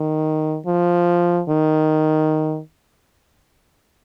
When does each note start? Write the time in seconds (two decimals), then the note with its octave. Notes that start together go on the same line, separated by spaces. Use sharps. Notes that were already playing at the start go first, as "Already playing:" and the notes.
Already playing: D#3
0.67 F3
1.49 D#3